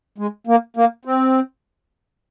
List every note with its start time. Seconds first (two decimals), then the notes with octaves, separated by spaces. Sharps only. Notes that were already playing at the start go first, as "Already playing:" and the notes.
0.18 G#3
0.47 A#3
0.76 A#3
1.05 C4